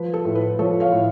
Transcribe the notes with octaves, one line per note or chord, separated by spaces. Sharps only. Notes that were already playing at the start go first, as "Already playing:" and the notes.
Already playing: F3 B4
A4
A2
B4
F3 A4 C#5
C#5 F5
A2